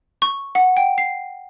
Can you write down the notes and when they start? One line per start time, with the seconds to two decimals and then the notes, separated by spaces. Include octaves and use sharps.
0.22 C#6
0.55 F#5
0.77 G5
0.98 C7